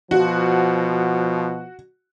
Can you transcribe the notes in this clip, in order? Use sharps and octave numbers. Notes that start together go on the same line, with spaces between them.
B2 F3 F#4